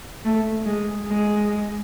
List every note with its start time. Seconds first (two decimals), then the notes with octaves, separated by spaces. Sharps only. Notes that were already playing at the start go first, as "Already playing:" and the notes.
0.25 A3
0.66 G#3
1.07 G#3